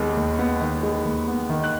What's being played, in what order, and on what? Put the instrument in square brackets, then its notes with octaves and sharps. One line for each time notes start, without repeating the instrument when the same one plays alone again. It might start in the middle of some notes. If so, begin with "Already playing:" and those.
Already playing: [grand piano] D#2 D#3 G#3 B3
D#2
B3
D#3
G#3
D#2
B3
D#3
F#6